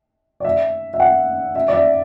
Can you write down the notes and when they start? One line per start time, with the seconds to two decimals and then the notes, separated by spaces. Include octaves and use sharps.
0.40 D5
0.45 E5
0.94 E5
1.00 F#5
1.55 E5
1.68 D5
1.73 E5